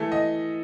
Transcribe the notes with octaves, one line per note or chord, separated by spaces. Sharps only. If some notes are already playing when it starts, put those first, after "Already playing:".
Already playing: E3 A3
D#5